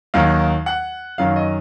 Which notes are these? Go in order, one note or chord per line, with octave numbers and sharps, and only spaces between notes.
D#2 D#3 F#3 F5
F#5
F#2 D#3 F#3 F5
D#5